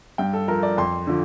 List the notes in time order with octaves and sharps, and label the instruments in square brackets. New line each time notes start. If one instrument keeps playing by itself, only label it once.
[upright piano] G2 G5
A4
F3 A#4
D5
F2 C6
D3 F3